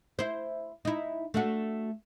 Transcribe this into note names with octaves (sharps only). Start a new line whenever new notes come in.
E4 C5
D#4 E4
A3 D4 F#4